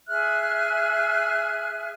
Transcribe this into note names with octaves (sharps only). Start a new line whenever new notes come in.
G#4 E5 F6 F#6